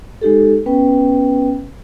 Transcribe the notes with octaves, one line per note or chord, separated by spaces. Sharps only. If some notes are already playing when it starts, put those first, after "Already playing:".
G#3 D#4 G4 A4
B3 C#4 B4 G5